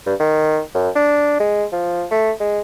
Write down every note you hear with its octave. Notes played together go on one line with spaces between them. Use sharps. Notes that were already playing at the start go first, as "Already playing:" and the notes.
G2
D#3
F#2
D4
G#3
F3
A3
G#3